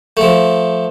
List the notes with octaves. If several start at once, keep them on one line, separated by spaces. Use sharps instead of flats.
F3 A3